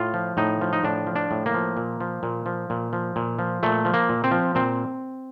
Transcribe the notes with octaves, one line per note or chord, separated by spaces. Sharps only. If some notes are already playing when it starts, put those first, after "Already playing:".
Already playing: A2 F4
F3
A2 D#4
F3
D#4
A2 D4
F3
D4
A2
A#3
F3
A#2
F3
A#2
F3
A#2
F3
A#2
F3
A#2 A3
F3
A#3
A#2
C4
F3
A#2 C4